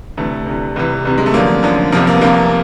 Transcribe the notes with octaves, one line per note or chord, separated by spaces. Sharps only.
D2 C3 E3 A3
D2 C3 E3
C2 C3 E3
C2 C3 E3
G#3
A3
F#2 D3 F3 A#3
F#2 D3 F3
C2 C3 F3 A#3
A#3
B3
C2 C3 F3 A#3